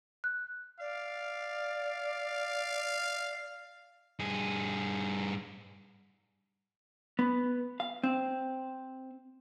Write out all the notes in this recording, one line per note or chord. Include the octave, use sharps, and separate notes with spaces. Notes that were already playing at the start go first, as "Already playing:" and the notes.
F#6
D5 F5
G2 G#4
B3
F5
C4